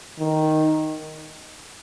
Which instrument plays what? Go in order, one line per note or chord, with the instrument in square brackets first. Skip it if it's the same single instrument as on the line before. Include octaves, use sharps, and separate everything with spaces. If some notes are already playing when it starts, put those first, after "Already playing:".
[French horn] D#3